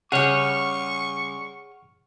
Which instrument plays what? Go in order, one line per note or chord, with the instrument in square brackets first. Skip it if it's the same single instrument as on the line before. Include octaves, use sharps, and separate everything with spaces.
[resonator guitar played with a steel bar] C#3 G3 [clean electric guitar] G#4 C#5 [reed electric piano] F#5 F6 [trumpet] C#6